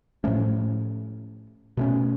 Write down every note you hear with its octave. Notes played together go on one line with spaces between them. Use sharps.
A2 F3 A3 C#4
B2 A3 C#4